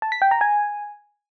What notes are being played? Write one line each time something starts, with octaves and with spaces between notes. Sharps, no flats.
A5
B6
G5
A#5
G#5